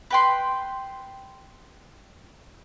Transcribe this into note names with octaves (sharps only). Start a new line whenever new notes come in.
B4 G5 C6